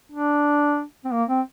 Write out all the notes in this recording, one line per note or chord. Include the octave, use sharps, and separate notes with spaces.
D4
C4
A#3
C4